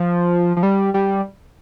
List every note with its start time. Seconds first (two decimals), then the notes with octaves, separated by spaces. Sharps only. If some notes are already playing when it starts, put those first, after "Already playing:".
Already playing: F3
0.57 F3
0.63 G3
0.94 G3